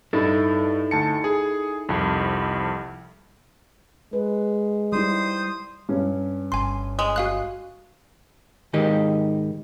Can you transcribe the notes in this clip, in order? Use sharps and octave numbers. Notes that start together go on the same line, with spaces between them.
G2 D#4 E4 A4
D2 A5 C#7
G#4
C2 F2
G#3 B4
G3 D#4 E4 C5 D#6
G2 C#4
G1 G#5 C6
G#3
F#4 F5 F#6
G#2 D#3 D#4 G4 D#5